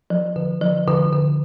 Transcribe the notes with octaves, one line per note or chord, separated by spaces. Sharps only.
F3
D3
F3
D3
D3